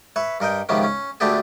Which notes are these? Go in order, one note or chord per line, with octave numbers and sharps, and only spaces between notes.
B4 C#5 E5
G2 A#4 D#5 G5
C#2 C3 D#3 F3 B3 C#4
C#4
D2 A3 B3 D4 G4 G#4